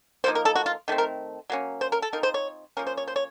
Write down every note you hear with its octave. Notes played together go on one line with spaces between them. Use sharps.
F3 A#3 D#4 C5
A#4
A4
F#4
F4
D#3 A3 C4
A#4
F#3 A#3 C#4
C5
A#4
A4
F3 C4 D#4 A#4
C5
C#5
F3 A#3 C#4 A#4
C5
C#5
C5
C#5